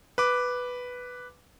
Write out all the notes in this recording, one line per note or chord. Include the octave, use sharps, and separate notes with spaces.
B4 D6